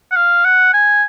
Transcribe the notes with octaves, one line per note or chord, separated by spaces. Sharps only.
F#5
F5
F#5
G#5